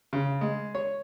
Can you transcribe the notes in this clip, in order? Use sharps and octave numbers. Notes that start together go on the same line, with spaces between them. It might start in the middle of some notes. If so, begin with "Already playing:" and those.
C#3
G#3
C#5